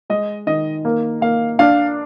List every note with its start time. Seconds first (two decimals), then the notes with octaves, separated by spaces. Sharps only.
0.10 G#3 D#5
0.47 D#3 D#5
0.85 A#3
1.21 A#3 F5
1.59 D4 F5